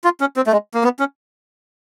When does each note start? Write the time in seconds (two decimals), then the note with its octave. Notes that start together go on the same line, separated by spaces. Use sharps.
0.04 F4
0.21 C#4
0.36 C4
0.47 A3
0.52 G#3
0.74 A#3
0.84 B3
0.99 C#4